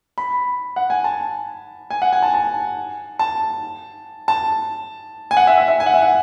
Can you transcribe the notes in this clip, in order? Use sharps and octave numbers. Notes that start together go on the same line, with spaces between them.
B5
F#5
G#5
A5
G#5
F#5
G#5
A5
A5
A5
A5
G#5
F#5
E5
E5
E5
G#5
F#5
E5
F#5